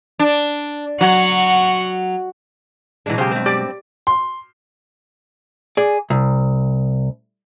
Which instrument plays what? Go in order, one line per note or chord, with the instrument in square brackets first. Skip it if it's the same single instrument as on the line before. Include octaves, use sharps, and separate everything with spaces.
[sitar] D4
[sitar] F#3 [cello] F#4 F#5
[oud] B2 F#3 G#3 [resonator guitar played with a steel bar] E3 D4
[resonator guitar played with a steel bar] C#3 G4 [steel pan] C5
[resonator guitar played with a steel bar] G2 C4
[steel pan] G4 D5 D6
[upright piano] C6
[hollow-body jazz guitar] G#4 D5
C2